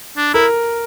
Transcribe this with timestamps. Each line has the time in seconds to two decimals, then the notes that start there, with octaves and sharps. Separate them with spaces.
0.17 D4
0.34 E4 A#4